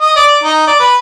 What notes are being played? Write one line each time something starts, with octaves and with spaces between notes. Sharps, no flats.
D#5
D5
D#4
D5
B4